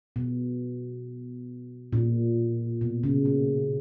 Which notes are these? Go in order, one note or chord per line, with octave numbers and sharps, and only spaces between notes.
B2
A#2
B2
C#3
A#3